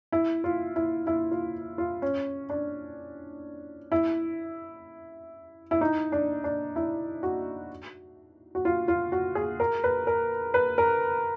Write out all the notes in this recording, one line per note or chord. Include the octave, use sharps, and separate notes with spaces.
E4
F4
E4
E4
F4
F4
C#4
D4
E4
E4
D#4
D4
D4
E4
F#4
F#4
F4
F4
F#4
G#4
A#4
B4
A#4
B4
A#4